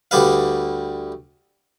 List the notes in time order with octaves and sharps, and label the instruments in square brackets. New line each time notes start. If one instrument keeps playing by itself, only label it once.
[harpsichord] D2 D3 G3 B4 F5